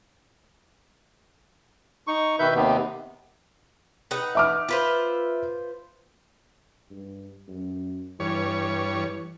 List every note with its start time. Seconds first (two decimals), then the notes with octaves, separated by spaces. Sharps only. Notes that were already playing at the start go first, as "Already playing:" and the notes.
2.07 D#4 C#6
2.39 B2 D#3 B4 E5 G6
2.55 D#2 C3 D#3 B3
4.11 D#4 B4 F#5
4.35 E5 D6 F6
4.69 F4 B4 C5
6.90 G2
7.48 F#2
8.20 G2 E3 C#5